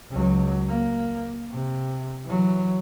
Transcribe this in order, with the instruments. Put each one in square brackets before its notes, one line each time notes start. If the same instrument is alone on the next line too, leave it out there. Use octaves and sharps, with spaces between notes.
[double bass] C#2 F#3
A#3
C3
E3 F#3